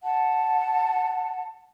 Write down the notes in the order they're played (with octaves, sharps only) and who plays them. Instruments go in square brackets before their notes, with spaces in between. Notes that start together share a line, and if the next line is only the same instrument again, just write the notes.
[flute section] F#5 A5